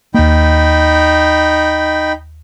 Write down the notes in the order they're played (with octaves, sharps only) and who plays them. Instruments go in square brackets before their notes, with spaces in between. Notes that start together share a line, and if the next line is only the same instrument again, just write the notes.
[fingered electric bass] D#2 A#3 [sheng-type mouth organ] D#4 G5 B5